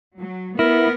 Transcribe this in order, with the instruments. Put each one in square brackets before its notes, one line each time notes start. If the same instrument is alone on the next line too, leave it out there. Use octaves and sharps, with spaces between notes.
[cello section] F#3
[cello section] B3 [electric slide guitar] E4 [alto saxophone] A#4